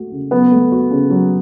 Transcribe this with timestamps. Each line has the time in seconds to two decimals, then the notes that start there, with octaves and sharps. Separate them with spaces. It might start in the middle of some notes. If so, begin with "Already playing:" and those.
Already playing: A3 F#4
0.12 C#3
0.31 F#3 B3
0.52 A3
0.72 F#4
0.91 C#3
1.10 F#3